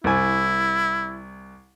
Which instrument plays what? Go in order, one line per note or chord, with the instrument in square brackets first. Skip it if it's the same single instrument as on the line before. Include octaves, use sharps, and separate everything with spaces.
[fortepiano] C2 G#5 [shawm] E4